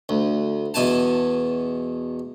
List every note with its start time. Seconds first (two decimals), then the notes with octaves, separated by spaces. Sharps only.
0.09 D2
0.74 E2 B2 G#5 A5